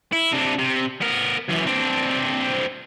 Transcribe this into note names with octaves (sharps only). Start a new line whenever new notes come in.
E4
C3 D4
C3
B3 A#4
F#2 E3
C4 D4